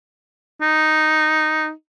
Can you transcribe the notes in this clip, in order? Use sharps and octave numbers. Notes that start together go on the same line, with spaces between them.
D#4